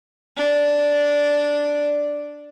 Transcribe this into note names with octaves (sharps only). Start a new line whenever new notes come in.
D4 D5